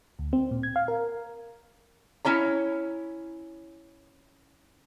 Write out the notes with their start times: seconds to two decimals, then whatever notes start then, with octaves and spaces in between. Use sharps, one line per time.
0.19 D2
0.33 C4
0.51 A#2
0.63 G#6
0.76 F5
0.88 A#4
2.25 C#4 E4 C#5 A#5